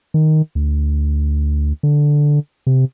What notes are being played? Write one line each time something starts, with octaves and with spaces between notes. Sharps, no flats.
D#3
D2
D3
C3